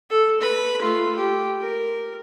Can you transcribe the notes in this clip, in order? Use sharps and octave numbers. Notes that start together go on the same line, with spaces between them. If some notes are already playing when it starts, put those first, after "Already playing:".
A4
B4 B5
A3 F4
G4
A#4